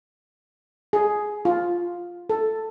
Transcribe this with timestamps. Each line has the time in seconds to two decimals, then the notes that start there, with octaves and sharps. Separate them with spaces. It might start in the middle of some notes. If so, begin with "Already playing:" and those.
0.93 G#4
1.45 F4
2.30 A4